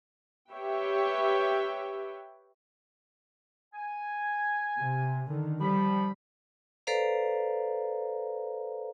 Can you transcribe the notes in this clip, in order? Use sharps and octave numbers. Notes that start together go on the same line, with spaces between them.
G4 B4 C#5 E5 G5
G#5
C3
D3 D#3
F3 G3 B5
A4 B4 C5 D5 F5 A#5